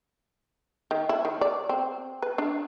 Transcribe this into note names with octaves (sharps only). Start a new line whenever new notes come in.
D#3
E4
D#3
D5
C4
B4
D4